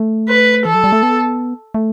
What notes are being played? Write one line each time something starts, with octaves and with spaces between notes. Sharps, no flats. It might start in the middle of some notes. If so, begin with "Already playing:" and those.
Already playing: A3
B4
E3 A4
F#3
G3
A3
B3
A3